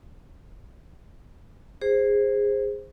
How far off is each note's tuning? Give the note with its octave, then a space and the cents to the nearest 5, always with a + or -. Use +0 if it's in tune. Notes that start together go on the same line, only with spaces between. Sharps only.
G#4 -20 C5 +5